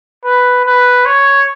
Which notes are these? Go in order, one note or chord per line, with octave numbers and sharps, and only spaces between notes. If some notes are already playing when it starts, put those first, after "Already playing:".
B4
B4
C#5